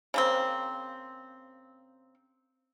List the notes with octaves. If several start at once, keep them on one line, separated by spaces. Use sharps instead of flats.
C#3 A#3 C4